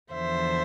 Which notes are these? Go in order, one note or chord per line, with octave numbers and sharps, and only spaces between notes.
E2 D3 F3 C5 E5